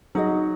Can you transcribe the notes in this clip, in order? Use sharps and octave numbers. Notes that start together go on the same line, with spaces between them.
F#3 D#4 G#4 D#5